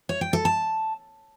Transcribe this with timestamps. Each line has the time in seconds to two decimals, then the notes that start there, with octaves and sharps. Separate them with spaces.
0.09 C#5
0.21 G5
0.33 A4
0.45 A5